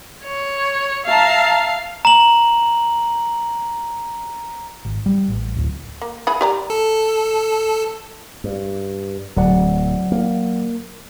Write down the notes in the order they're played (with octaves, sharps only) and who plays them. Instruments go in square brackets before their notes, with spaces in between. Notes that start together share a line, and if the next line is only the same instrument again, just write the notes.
[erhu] C#5
[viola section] E5 A5 A#5 [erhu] F5
[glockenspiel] A#5 F#7
[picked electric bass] G#1
G3
A1
D1
[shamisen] A#3
E3 G#4 B5
G4 D5 A#5
[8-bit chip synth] A4
[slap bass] G2
[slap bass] D1 [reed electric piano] F#3 D5 F#5
[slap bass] A#3